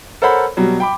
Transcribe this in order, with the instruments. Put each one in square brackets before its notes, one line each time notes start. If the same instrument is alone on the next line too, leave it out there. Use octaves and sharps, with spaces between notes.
[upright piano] A4 A#4 C5 C#5 F#5 B5
B2 F#3 G3
G5 B5 D6